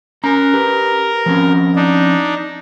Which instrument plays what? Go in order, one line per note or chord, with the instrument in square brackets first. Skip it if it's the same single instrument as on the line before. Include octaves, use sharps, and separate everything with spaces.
[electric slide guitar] C#4 A#5 [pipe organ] A#4
[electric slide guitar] G4 B4
F3 C4 C#4
[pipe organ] D4 D#4